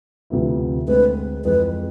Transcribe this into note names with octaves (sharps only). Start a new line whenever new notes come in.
D2 C3 F3 B3 E4
D2 D3 G#3 C4 B4
F2 E3 G#3 B4